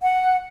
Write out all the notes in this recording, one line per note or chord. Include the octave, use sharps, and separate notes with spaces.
F#5